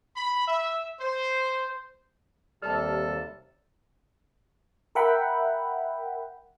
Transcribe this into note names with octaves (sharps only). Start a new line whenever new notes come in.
B5
E5
C5
D#2 C3 G3 A4 A5 F6
A#4 E5 F#5 G5 B5